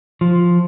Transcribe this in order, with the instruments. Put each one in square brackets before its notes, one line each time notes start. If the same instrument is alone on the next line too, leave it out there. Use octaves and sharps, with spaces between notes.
[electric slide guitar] F3